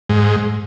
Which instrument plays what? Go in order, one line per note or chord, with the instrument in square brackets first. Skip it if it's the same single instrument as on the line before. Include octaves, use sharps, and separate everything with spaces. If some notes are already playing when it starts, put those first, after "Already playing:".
[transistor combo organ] G#2